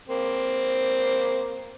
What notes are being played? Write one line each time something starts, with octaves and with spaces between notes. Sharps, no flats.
A#3 C4